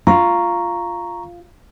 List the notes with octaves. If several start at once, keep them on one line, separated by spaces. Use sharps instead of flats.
F4 A#5 C#6